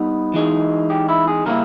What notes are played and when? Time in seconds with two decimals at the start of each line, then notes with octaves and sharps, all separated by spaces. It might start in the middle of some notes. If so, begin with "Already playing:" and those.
Already playing: G3 B3 D#4
0.34 E3 G#3 D#4
0.90 G4
1.09 E4
1.27 G#4
1.46 C#3 G3 A#3 E4 A#4